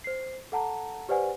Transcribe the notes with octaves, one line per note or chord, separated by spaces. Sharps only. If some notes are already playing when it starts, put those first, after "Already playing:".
C5 C7
A4 F#5 A5 A#5
G4 B4 C5 D5 F#5 G#5